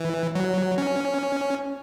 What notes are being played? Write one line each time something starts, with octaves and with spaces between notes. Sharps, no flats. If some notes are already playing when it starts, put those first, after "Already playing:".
Already playing: E3
F#3
C#4